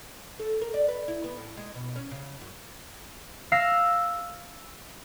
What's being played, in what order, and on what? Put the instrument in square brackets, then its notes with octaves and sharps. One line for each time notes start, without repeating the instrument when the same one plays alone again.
[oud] A4
A#4
D5
B4
E4
B3
A2
G#3
B2
C#4
C#3
F#2
[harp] F5 E6 A#6 C7